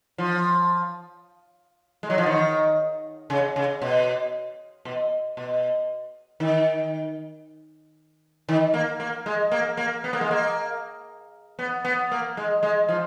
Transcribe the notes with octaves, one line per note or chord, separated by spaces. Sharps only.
F3
G#3
F#3
F3
D#3
C#3
C#3
B2
B2
B2
D#3
D#3
A#3
A#3
G#3
A#3
A#3
B3
A#3
G#3
A#3
B3
B3
A#3
G#3
G#3
F3